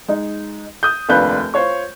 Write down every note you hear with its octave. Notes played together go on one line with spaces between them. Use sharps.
G#3 D#4
D#6 G6
F1 D#2 D4 F4 B4 G6
F4 C5 C#5 C#6